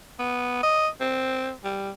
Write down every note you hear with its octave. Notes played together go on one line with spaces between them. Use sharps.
B3
D#5
C4
G3